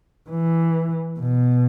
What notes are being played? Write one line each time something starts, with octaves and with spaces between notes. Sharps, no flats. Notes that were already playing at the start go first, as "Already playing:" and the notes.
E3
B2